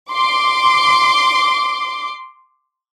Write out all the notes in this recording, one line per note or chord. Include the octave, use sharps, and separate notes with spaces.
C6 D6